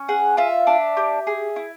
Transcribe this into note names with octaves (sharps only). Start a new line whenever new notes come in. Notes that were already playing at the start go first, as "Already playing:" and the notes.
Already playing: C#4
G#4 F#5
F4 E5
D4
G4
G#4
E4